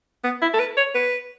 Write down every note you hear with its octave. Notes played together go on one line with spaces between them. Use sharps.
B3
E4
A4
B4
C#5
B4